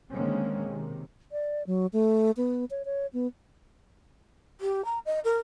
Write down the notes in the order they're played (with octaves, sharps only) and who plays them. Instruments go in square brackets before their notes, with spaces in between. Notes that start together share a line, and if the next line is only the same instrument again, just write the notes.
[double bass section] D3 D#3 G#3 A#3 C4 C#4
C3 D#3
[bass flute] D5
F#3
A3
B3
C#5
C#5
B3
[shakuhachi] G4
A#5
D#5
A#4